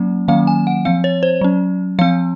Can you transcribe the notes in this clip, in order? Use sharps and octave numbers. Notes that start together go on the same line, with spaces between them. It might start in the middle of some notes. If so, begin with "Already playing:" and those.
Already playing: F#3 A#3 C#4
D#3 F#3 A#3 C#4 F5
G#5
F#5
F3 C4 F5
C#5
C5
F#3 C#4
F3 C4 F5